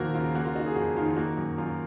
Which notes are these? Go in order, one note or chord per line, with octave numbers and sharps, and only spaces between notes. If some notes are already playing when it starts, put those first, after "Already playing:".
Already playing: D#2 F3 A#3 F#4 A#4
C#3 F4
A#3 F#4
F4
D#4 F#4
G#4
F2 F#4
D#3 F4
F4
A#3 F#4
F#2
F#2 F4